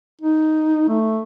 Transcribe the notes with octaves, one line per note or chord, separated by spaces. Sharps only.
D#4
A3